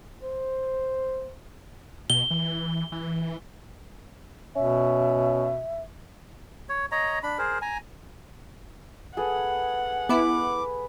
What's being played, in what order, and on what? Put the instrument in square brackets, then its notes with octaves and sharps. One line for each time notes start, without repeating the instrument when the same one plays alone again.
[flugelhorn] C5
[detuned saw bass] B2 [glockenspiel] G7
[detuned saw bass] E3
E3
[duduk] B2 [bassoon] C#4 [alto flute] E5
[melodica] C#5
C#5 D#5 A#5
D4 B5
G#4 A#4 C5
G#5 A#5
[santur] G#4 A4 B4 [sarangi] F#5
[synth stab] B3 E4 [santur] B4 [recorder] D6